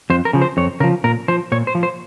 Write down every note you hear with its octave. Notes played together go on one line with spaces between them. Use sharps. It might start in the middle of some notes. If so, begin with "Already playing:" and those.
F2 C5
A#4
C#3 F3
C5
F2 C#5
C#3 F3 A#4
A#2 A#4
F3 C5
A#2 C#5
C5
F3
C5